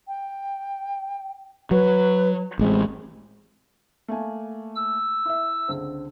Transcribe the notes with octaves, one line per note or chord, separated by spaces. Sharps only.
G5
F#3 B4
A1 G#3 C4
A3 A#3 G#5
E6
E4 E5
C#2 D3 C4